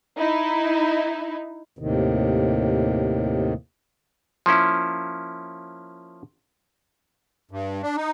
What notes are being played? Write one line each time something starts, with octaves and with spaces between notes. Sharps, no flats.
D#4 E4
D#2 A2 C3 D#3
F3 A#3 C#4 E4
G2
D4
D#4